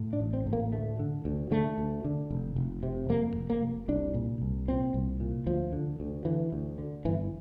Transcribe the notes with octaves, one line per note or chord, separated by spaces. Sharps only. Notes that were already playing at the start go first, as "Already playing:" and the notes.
Already playing: A2
D4
A1
C4
A2
A#3
D2 A3
D3
D2
D3 A3
D2
D3
F1
F1
C3
F2 A#3
F1
A#3
F1
C2 D4
A#2
C2
A#2 C4
C2
A#2
D2 F3
D3
D2
D3 E3
D2
D3
G1 E3